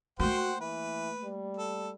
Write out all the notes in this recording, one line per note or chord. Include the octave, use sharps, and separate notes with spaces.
A3 A#3 F#4 C5 F#5 G5
E3 B4
G3
A4